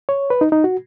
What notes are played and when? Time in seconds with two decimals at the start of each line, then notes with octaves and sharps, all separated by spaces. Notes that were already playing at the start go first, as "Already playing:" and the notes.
0.09 C#5
0.30 B4
0.41 D#4
0.52 D#4
0.64 F#4